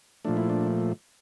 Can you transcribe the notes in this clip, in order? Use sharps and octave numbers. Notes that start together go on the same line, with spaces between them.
A#2 F3 A3 D4
E4
D4